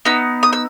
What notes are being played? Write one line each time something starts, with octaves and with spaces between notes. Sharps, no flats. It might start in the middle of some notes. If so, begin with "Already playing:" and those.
B3 D#4 E6
D#6
E6